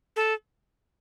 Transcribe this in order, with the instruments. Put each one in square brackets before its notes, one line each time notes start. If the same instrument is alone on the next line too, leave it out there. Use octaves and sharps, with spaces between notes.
[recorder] A4